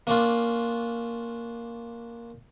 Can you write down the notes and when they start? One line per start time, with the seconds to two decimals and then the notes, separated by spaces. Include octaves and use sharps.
0.07 A#3 C#4 D4 F4